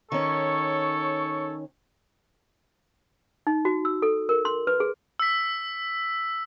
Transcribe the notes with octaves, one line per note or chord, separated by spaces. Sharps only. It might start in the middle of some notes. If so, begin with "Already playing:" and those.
D#3 C#4 A4 C#5 C#6
D#4
F#4
E6
A4
A#4
C6
B4
G#4
E6 B6